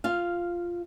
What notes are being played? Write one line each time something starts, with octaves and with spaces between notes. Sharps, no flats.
F4 F5